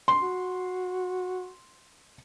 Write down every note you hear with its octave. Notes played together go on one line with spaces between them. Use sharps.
C6
F#4